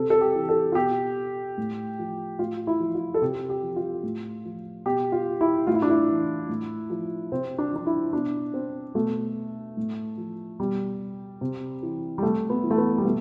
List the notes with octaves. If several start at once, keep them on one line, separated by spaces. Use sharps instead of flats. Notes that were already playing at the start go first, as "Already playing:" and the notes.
Already playing: C3 A4
A4
G4
E3
A4
F4
B2 G4
A2
F3
A2 F4
E4
F3
F4
A4
C3 G4
G4
F3
F4
A2
F3
B2 G4
F4
E4
A2 F4
E4
D4
E4
E3
A2
F3
C3 C4
D4
F3 D4
E4
B2 D4
C4
B2 A3
A2
F3
B2 G3
C3
E3
G3
C3 A3
B3
E3
A3
B3
G3
B2 A3